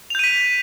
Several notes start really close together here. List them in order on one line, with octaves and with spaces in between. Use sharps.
F7 G6 D#7 B6